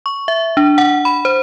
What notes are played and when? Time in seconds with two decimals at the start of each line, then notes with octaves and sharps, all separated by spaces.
0.06 C#6
0.28 E5
0.57 D4
0.78 F#5
1.05 B5
1.25 C5